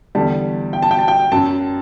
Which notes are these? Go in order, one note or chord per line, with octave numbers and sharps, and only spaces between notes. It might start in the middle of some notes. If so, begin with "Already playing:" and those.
E2 D3 G3 A5
G5
A5
G5
A5
G5
F#2 F#3 A5